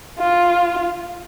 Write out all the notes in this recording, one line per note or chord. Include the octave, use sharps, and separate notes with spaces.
F4